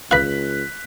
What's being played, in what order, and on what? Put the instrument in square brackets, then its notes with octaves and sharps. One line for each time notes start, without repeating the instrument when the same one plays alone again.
[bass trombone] C#2 [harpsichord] B4 F5 [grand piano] F#6 B6